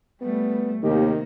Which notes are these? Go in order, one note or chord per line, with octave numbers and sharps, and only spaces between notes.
G3 A3 B3
D#2 C3 D#3 A#3 G4